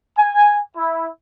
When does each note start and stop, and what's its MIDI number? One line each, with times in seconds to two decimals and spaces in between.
0.17 0.60 80
0.76 1.06 64